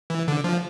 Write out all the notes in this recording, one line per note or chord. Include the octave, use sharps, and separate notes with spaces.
E3
D3
F3